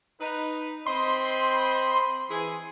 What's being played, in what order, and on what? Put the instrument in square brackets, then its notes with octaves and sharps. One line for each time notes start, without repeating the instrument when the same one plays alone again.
[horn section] D#4 B4
[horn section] C4 D#5 B5 [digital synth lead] C6
[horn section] E3 G#4